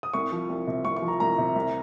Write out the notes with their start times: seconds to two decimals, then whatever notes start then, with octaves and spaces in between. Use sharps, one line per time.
0.03 D#6
0.13 C2 C#6
0.32 F3
0.49 C2
0.67 C3
0.85 C2 C#6
0.97 C#6
1.02 F3
1.08 A#5
1.20 C2 A#5
1.38 C3
1.56 C2